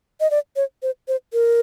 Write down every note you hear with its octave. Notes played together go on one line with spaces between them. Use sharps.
D#5
D5
C#5
C5
C5
A#4